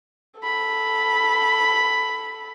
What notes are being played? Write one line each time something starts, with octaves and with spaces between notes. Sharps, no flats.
A4 B5